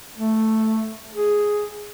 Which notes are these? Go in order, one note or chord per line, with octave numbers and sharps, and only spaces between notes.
A3
G#4